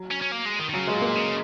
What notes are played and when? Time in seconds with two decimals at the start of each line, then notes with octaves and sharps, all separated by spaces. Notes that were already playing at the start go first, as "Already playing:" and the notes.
Already playing: F#3
0.11 C#4
0.22 C#4
0.31 A#3
0.45 G#3
0.59 D#3
0.69 D#3
0.73 C#3 F#3
0.87 G#3
0.94 A#2
1.01 A#3
1.15 C#3